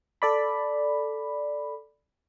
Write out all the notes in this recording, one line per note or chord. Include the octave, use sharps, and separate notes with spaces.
A4 D5 B5